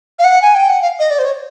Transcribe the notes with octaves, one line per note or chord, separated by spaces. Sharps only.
F5
F#5
G#5
G5
F#5
F5
D#5
D5
C5
C#5